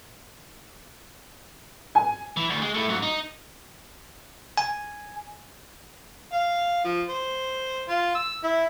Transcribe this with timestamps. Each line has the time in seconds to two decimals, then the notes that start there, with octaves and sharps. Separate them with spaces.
1.95 G#5
2.37 E3
2.50 D2
2.62 G#3
2.74 A3 E4
2.89 G#2 F#3
3.02 D#4
4.58 G#5
6.32 F5
6.84 F3
7.09 C5
7.89 F4
8.15 E6
8.43 E4